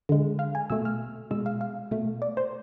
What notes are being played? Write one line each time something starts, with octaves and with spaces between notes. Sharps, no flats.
D3 G#3
F5
G#5
B2 A3 E6
F6
B2 G#3 E6
F5
F5
B2 A3
D5
C5